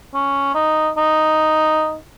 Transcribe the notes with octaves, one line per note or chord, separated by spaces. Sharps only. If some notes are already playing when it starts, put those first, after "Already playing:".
C#4
D#4
D#4